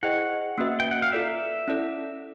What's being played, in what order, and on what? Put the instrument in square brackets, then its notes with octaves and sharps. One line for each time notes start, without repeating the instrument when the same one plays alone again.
[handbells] E4 G#4 C5 D#5 G5 [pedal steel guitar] F#5
[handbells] A#3 C#4 F#4 B4 E5
[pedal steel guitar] G5
F#5
F5
[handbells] F4 A4 D5 [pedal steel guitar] E5
[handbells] C#4 E4 A4 D5